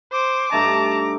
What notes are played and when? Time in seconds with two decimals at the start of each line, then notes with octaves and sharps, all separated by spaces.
0.12 C5 D6
0.52 G2 A3 D#4 A5 A#5